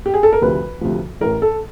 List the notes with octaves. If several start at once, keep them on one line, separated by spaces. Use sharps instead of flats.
G4
G#4
A4
A#4
D2 C3 F3 B4
D2 C3 F3
A1 A2 E3 A#4
A4